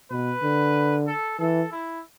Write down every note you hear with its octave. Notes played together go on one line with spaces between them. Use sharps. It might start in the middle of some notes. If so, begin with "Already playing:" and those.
B2 B4
D3
A4
E3 A4
E4